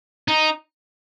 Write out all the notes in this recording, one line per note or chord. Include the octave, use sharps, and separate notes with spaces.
D#4